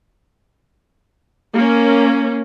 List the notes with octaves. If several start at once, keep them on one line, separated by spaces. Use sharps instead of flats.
A#3 C#4